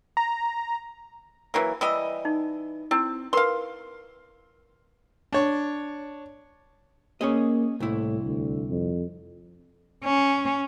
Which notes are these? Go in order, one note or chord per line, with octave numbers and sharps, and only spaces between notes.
A#5
E3 F#3 A#3
E3 G3 D#5 E6
D#4
C4 E4
A#4 B4 F5 C6
D4 C#5
A#3 C#4 G#4 D#5
C2 A2 E4
D2
F2
C#4